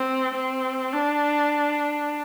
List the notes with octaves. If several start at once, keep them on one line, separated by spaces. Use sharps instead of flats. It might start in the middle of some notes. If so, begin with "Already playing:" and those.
Already playing: C4
C4
D4